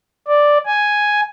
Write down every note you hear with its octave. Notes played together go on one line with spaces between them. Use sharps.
D5
G#5